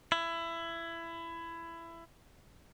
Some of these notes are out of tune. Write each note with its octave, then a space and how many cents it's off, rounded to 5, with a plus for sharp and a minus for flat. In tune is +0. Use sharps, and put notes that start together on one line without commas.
E4 +20